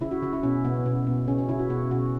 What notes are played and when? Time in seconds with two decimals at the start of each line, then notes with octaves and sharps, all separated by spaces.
0.01 C#3 E4
0.11 F#4
0.22 C#3 F#4
0.33 E4
0.43 B2 C#4
0.65 B2 B3
0.86 B2
1.07 B2
1.28 C#3 C#4
1.38 C#4
1.49 C#3 E4
1.59 F#4
1.70 B2 F#4
1.91 B2 F#4